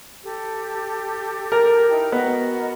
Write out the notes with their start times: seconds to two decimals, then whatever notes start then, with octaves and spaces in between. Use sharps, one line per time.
0.24 G4 A4
1.52 A#4
1.89 D#4 E4 G5
2.12 B3 F#4 A#4 D#5